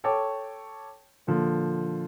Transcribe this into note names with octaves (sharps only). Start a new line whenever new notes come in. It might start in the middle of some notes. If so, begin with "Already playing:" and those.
A4 C#5 G5 A5 C#6 D6
A#2 D3 F3